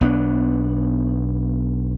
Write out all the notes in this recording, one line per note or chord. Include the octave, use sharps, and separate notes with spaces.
B1 B3 D4